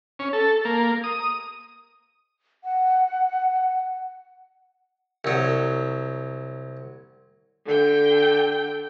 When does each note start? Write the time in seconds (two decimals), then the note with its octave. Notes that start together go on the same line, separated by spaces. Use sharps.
0.19 C#4
0.33 A4
0.65 A#3
1.04 D#6
2.64 F#5
5.25 C2 F#3
7.66 D3 G5